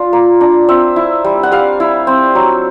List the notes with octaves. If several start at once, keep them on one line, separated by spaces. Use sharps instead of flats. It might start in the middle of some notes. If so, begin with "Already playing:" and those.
Already playing: D4 F4
A#3
D4
C4 E5
E4
G3
F#5
G3 F5
E4
C4
F#3